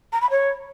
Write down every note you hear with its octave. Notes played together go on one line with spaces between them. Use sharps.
A#5
B5
C#5